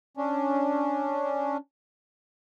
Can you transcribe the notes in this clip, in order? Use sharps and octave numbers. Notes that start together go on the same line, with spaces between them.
C#4 D4